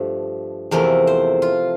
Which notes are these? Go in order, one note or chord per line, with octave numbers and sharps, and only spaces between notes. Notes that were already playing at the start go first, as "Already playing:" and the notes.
Already playing: G2 F3 A3
E2 C3 F3 A3 A#4
C5
F4